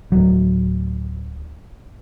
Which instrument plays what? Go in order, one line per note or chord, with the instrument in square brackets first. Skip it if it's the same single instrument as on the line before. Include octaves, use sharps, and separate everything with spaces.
[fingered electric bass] D1 F#3